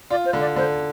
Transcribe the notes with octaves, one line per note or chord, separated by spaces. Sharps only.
F4 D5
C5
D3
D5
D3 C5